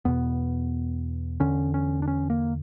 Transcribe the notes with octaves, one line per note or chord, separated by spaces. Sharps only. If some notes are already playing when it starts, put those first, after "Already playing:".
E2 B2 B3
E2 D3 C#4
C#4
D4
C#4
A#3